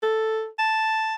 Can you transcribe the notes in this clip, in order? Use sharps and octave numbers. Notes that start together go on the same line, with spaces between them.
A4
A5